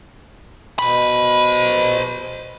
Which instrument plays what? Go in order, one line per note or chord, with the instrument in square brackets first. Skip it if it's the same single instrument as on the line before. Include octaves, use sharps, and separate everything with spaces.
[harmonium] B2 [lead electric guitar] C5 B5